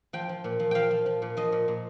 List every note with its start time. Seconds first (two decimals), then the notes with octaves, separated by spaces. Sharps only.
0.13 F3 G5
0.29 F3
0.44 A#2
0.60 F3
0.71 F3 F5 G5
0.91 F3
1.06 F3
1.22 A#2
1.37 F3 D#5
1.52 A#2
1.68 A#2